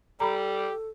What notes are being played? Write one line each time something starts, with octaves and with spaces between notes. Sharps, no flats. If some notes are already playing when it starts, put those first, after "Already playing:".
G3 G4 A4 A#5 B5